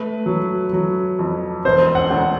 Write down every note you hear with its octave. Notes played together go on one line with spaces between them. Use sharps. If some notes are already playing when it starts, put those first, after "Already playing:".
Already playing: A3 B4
F#3
F#3
F2
E1 C5
F#5
D2